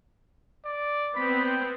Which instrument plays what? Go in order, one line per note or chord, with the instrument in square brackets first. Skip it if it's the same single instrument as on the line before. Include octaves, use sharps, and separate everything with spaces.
[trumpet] D5
[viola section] B3 C4 [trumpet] B5
[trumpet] G5